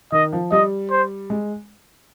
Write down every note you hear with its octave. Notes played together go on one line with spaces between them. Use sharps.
D#3 D#5
F3
G3 D#5
C5
G#3